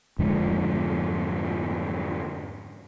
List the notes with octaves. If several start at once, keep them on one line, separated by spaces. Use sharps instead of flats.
F2 G#2 D3 F3